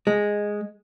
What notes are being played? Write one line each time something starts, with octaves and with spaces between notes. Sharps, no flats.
G#3